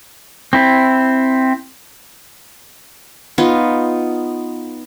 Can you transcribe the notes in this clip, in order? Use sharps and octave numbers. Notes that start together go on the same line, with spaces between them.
C4 E4
B3 D#4 F4